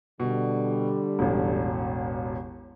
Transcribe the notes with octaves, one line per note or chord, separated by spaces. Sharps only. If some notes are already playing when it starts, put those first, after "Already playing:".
B2 D3 G3
E1 A1